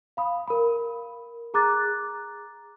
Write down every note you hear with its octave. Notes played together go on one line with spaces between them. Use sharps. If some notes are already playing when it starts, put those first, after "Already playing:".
F5 B5 D#6
A#4 B5
G#4 A#5 D6 F#6 A6